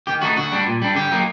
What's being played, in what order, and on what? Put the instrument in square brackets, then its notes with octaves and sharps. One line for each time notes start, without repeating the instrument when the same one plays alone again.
[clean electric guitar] D#3 G4
A3 D#4 F#4
D3 F#4
G3 D4
A#2
G3 D4
D3 G4
F#3 A#3 D#4